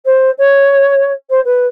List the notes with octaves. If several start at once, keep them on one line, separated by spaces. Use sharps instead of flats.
C5
C#5
C5
B4